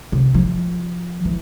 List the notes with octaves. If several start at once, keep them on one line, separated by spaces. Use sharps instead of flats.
C3
F3
E3